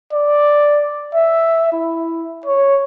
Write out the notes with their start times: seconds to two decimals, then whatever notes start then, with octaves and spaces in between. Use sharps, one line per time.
0.13 D5
1.15 E5
1.73 E4
2.46 C#5